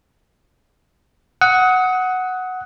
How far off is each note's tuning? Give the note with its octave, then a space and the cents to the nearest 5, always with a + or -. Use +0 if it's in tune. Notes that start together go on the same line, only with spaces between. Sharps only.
F#5 +0 D#6 +30